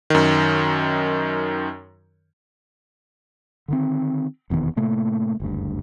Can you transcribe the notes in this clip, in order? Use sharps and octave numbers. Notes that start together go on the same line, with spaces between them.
F#2 D#3
D3 D#3 C4
F1 E2 B2 D#3
A2 C3 A3 A#3
F#1 D2 G2